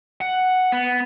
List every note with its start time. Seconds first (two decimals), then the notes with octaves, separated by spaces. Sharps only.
0.21 F#5
0.72 B3